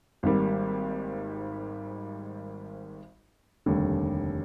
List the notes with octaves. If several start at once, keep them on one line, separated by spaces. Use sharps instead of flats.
G#1 G#2 D#3 G3 A#3
F1 D#2 D3 G3